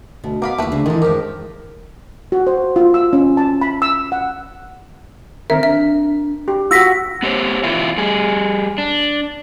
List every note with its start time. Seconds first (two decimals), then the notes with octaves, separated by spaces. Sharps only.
0.24 D2 B2
0.42 B3 A#4 F5 B5 D6
0.58 D#2 A3 E4 B4 F#5
0.72 D2 C#3 D4 G#4 C5
0.86 A#2 D#3 E3 G#3 D#4 E4 A4
1.02 F#2 F3 G#3 G4 A#4
2.32 F#4
2.47 C5
2.76 F4
2.94 E6
3.13 C#4
3.37 A5
3.61 B5
3.82 E6
4.12 F#5
5.50 D#3 C4 A#4 E5
5.63 D4 E5
6.48 G4
6.71 F4 F#4 F#5 E6 A#6 B6
7.23 B3 G4 C5 C#5
7.63 E2 B2 B3 E4 F4
7.98 G3 G#4
8.78 D4